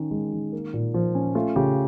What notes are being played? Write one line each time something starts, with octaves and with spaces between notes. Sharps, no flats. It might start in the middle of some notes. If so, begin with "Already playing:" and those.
Already playing: D#3 C#4
G#3
D#3
A#3
A#2
F3
C#4
A3 F4
C#3 G4